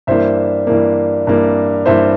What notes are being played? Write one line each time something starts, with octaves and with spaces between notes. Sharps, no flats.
G2 E3 A#3 C5 E5
G2 E3 A#3
G2 E3 A#3
G2 E3 A#3 C5 E5